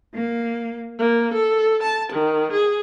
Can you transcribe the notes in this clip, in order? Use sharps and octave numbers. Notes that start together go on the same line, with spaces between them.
A#3
A#3
A4
A5
D#3
G#4